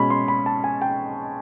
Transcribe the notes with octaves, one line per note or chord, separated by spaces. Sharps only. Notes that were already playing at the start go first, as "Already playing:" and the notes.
Already playing: B2 G#3 C#4 B5
C6
B5
A5
G#5
G5